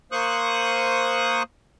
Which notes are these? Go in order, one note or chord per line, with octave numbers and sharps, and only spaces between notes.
A#3 C5 C#6 D#6 F#6